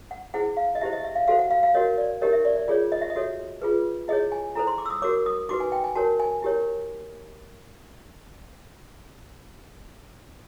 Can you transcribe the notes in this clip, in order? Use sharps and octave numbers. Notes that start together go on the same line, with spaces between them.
F#5
E4 G#4 C5 F#5
F5
D#5
E4 G4 C5 E5
D#5
E5
F5
F#4 A4 C5 F5
F#5
F5
F5
F#4 A#4 C#5 D#5
D5
D#4 G4 A#4 C#5 D#5
E5
D5
D5
F4 G#4 C#5 D5
D#5
E5
D#5
F#4 A4 C#5
F4 G#4 B4
E4 G#4 C#5 D#5
G#5
E4 A4 C5 A#5
C6
D6
E6
D#6
F#4 A#4 C#5 D6
D#6
D#4 F#4 B4 D6
G#5
G5
G#5
F#4 A#4 C#5 A5
G#5
E4 G4 A#4 C#5